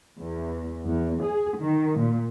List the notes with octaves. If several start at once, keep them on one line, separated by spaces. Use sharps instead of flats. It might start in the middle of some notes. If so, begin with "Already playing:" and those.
E2
E2
G#4
D#3
A#2